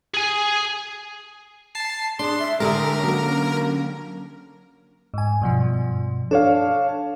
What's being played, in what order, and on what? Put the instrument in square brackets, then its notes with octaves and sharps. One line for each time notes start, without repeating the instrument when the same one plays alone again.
[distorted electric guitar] G#4 G#5
[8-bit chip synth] A5 C7
[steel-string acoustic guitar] D4 [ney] G#4 [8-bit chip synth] C6
[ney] E5
[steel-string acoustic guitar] D3 G4 [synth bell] G#3 D#6 [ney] A4 [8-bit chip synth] A#4
[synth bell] F#3 C#4 [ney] A#3
[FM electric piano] G#2 G#5
G2 B2 F3
[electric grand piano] D4 C#5 F5 [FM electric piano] A4